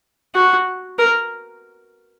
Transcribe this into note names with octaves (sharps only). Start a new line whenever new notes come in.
F#4
A#4